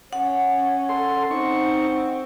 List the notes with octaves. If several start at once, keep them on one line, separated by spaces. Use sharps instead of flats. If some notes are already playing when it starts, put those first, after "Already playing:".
C#4 F#5
A4 C6
C4 D#4 C#6